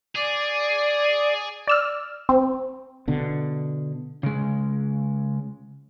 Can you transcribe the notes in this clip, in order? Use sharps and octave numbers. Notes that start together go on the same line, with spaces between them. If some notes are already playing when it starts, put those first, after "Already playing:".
G#4 D5
D5 E6 F6
C4
B2 D3
C#3 G#3